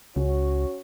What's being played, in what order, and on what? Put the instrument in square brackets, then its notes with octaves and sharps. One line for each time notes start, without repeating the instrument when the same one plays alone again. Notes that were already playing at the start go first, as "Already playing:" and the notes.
[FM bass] C#2 [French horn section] C#4 F#4 C#5